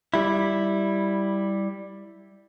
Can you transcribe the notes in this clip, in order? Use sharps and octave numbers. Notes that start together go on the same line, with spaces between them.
G3 E4